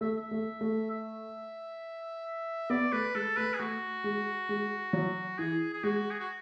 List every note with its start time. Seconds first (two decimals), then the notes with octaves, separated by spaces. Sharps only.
0.01 A3 E5
0.17 E5
0.31 A3
0.61 A3
0.91 E5
2.70 B3 D5
2.92 A3 B4
3.15 G#3 A4
3.37 A3 B4
3.54 G#4
3.60 A3 F#4
4.04 G#3
4.49 G#3
4.93 F#3
5.38 E3 G#4
5.74 G#4
5.84 G#3 F#4
6.11 G#4
6.20 F#4